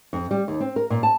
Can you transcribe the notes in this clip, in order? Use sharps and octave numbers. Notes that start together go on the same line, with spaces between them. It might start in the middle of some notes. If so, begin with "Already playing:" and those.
F2
G3
D#2
C4
A#4
A#2
A5